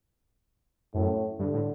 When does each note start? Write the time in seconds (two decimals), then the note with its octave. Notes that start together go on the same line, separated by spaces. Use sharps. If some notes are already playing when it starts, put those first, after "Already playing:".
0.94 F#2 A2
1.39 G2 D3
1.53 A2